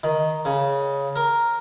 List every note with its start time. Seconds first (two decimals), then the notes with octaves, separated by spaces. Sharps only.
0.04 D#3
0.45 C#3
1.16 A#4